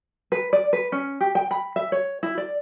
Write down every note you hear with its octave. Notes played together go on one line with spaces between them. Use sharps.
B4
D5
B4
C#4
G4
G5
B5
E5
C#5
E4
D5